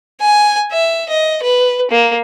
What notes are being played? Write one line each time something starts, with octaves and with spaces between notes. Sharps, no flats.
G#5
E5
D#5
B4
A#3